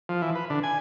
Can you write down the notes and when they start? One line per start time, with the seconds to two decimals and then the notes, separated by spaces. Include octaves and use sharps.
0.09 F3
0.22 E3
0.35 B4
0.50 D3
0.63 G#5